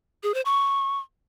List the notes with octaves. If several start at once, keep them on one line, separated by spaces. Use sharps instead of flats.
G#4
C5
C#6